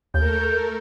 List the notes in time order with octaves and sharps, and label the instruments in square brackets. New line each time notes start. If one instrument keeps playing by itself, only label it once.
[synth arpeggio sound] D#2 [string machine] A3 A4 A#4 [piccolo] G6